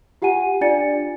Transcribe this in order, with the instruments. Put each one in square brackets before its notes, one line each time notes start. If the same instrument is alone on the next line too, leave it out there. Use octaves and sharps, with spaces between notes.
[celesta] F4 G4 F#5 G#5 D#7
D4 F4 D5 G#5 A6 C#7